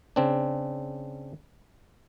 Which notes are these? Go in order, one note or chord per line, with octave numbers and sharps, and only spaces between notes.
C#3 C4 D4